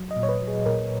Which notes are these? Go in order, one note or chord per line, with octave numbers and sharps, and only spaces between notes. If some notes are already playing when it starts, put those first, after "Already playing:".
Already playing: F#3
D#5
A#2
C#5
B4
F#3
G#4
A#2 A#4